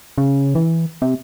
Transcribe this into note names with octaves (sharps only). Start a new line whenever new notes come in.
C#3
E3
C3